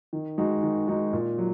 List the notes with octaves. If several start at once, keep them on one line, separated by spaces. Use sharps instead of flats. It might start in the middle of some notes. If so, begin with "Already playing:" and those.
D#3
G#3 D#4 F#4
D#3
G#3 D#4 F#4
A#2
F#3